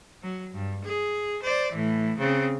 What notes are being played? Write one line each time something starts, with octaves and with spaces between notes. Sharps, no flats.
F#3
G2
G#4
C5 D5
A2 E3
C#3 C4